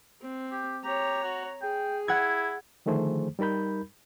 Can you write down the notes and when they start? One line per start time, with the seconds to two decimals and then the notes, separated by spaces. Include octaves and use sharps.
0.22 C4
0.51 G4
0.84 G4 C#5 A#5
1.23 F#4
1.62 G#4 G5
2.08 E4 F#5 G#6
2.86 D3 D#3 F3 A3 G#4 C5
3.39 G3 D#4 A#4 B5 G6